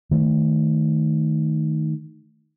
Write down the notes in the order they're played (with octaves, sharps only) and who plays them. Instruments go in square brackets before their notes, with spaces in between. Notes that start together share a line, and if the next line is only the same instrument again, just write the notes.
[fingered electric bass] D#3 A3